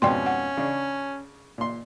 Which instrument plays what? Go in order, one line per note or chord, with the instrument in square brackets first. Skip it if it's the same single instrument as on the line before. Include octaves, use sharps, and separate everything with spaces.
[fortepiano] F2 G#2 B2 [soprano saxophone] C#4 [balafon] D5 G5 C6
[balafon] F#5
[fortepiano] C#3 D4
A#2 C6